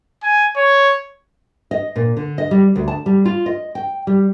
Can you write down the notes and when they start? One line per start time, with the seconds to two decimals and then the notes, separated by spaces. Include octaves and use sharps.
0.23 G#5
0.56 C#5
1.71 D#5
1.96 A#2
2.17 D3
2.38 D#5
2.51 G3
2.76 D2
2.88 A5
3.06 G3
3.25 F4
3.46 D#5
3.75 G5
4.07 G3